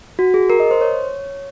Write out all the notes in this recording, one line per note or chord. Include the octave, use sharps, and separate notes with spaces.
F#4
G#4
A#4
D#5
C5
C#5